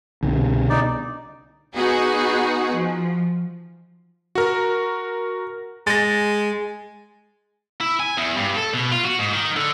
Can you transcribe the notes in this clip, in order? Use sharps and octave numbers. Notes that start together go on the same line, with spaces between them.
C2 B2 D3
D#4 D5
B3 D#4 F#4 G#4 F#5
F3
F#4 A#4
G#3 A6 A#6
E4
G#5
E2
G2
A4
B2
F4
F#4
G#2
D#3
D3